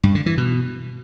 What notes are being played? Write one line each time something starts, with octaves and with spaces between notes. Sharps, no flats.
G2
D3
E3
B2